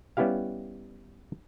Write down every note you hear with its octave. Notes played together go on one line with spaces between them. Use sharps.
G3 B3 C#4 E4 G4 F5